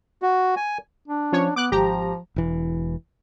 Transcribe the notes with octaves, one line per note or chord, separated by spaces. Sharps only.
F#4
G#5
D4
F3 C#4 C#5
B3 D6 F#6
G#1 F3 G4 A#5
E1 E3